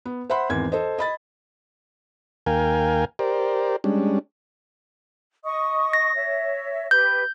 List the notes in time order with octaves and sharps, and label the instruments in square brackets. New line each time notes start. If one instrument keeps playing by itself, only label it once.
[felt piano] B3
C5 E5 F#5 B5 C6
G#1 E2 C4 G#6
A4 C5 D#5
D#5 B5 A6
[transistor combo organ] D#2 A#3 A#4 F5 G5 G#5
G4 A#4 C5 D5
G3 G#3 C#4 D4
[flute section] D#5 C#6 D#6
[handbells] A#6
[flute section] C#5 E5
[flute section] G4 B4 [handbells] G6